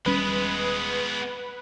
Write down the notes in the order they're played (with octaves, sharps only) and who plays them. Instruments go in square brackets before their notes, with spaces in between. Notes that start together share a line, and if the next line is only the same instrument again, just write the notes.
[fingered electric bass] D#1 G3 C#4 [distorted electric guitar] G#3 B3 [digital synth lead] B4